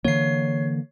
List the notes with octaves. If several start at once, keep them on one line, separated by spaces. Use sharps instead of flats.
D3 E3 A#3 C#5 C7